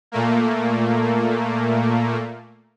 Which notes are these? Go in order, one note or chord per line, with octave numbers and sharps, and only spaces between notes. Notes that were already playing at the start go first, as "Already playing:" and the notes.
A#2 A3 A#3